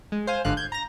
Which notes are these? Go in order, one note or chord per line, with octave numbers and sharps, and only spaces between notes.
G#3
C5 F5 G#5
G1 G#2 D3 F5 F#6
G6 G#6
A#5 A#6